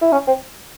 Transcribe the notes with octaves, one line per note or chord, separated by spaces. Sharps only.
E4
C#4
C4